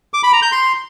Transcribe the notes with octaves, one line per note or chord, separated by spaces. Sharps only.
D6
B5
A#5
G6
C6